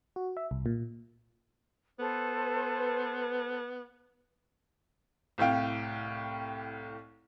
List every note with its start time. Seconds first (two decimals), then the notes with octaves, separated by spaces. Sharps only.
0.16 F#4
0.37 E5
0.51 C2
0.66 A#2
1.99 B3 A4 B4 C5
5.38 C2 A2 F5 G5